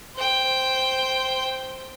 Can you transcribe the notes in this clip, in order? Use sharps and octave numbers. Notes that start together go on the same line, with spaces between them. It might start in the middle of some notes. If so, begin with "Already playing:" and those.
C5 G5